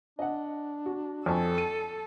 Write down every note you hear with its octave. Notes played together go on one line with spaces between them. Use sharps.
D4 D#5 F#5
F#4
F2 A4 G#5 A5 C#6
D#7